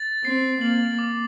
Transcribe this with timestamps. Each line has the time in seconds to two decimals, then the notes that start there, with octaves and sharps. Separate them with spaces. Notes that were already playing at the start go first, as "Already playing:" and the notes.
Already playing: A6
0.24 C4 C7
0.61 A#3 F#7
0.99 D6